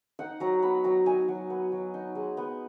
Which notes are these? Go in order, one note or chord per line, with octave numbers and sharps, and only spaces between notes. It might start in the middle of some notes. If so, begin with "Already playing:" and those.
D#4 F#5
F#3 A#5
A#5
B3 B5
F#3 A#5
D#4 G#5
F#3
B3
F#3
D#4
G#3
B3